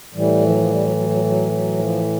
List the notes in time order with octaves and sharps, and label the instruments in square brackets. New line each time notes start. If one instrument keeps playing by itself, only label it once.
[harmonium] A2 E3 G3
F3
F#3
F3
G3
F#3
F#3
F#3
F#3
F#3
F3